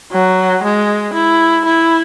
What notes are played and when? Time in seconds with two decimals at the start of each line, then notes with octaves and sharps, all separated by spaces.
0.12 F#3
0.63 G#3
1.13 E4
1.65 E4